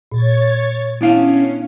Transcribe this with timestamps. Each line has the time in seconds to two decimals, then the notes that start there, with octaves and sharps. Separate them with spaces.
0.12 A#2 C#5 G#6 A6
1.01 B3 C#4 D4 E4 F5